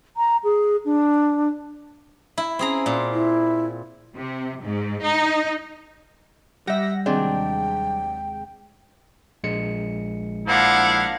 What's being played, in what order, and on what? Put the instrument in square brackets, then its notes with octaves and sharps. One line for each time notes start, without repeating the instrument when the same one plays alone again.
[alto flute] A#5
G#4
D4
[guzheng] E4
[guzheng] C4 G#4 A#5 [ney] C#4
[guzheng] A#2
[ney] E4
[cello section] C3
G#2
D#4
[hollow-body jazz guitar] G3 [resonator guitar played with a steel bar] G4 E5 [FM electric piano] F#5 A#6
[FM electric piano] D#2 C3 G#3 [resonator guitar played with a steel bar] F#3 C4 D4 [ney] G5
[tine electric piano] A#1 G#3 C#7
[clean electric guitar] F3 A#3 D4 [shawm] E4 [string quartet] F5 F#5